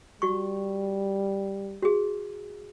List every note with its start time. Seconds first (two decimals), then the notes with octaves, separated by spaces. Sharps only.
0.22 G3 F#4 C#6
1.82 F#4 G#4